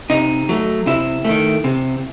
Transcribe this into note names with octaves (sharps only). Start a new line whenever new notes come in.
C3 D#4
F#3 A3
C3 E4
D#3 A3
C3